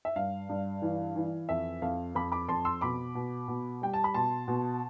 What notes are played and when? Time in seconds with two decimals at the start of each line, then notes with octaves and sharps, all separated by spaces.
0.05 E5
0.16 G2 F5
0.49 G2
0.82 E3
1.16 E3
1.49 F2 E5
1.82 F2 F5
2.15 F2 B5 D6
2.32 B5 D6
2.48 F2 A5 C6
2.65 C6 E6
2.81 B2 B5 D6
3.15 B2
3.48 B2
3.82 G3 G5
3.94 A5
4.04 B5
4.14 B2 A5 C6
4.48 B2